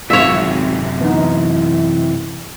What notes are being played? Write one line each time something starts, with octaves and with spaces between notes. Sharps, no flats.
G#1 F#2 C3 F4 C#5 E5
E3 B3 D#4